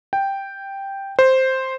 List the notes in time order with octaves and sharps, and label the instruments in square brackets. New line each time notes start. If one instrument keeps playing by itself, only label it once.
[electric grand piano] G5
C5